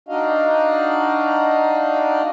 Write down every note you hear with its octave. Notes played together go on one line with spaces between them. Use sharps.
D4 D#4 F#4 D#5 F5